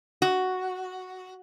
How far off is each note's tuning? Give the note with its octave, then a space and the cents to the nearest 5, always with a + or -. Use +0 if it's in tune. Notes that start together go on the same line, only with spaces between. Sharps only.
F#4 +5